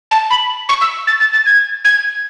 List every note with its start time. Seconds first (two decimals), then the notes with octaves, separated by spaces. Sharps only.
0.11 A5
0.30 B5
0.69 C#6
0.81 E6
1.07 A6
1.20 A6
1.33 A6
1.46 G#6
1.85 G#6